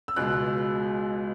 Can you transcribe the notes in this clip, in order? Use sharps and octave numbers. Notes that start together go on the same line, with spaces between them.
E6
C#2 B2 G#3 F#6